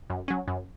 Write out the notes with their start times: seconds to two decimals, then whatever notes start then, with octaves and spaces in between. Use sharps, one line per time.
0.10 F#2
0.28 F#3 C#4
0.48 F#2